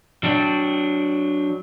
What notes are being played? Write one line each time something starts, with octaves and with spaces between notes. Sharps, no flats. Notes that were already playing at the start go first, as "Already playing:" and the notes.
F#3 D4 G5